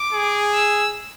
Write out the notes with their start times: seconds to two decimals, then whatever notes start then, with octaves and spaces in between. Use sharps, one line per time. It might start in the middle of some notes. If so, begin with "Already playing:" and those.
Already playing: D6
0.13 G#4
0.54 E6